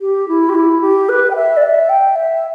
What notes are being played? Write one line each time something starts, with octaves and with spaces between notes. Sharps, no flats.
G4
E4
G4
E4
G4
B4
G5
E5
D5
E5
G5
E5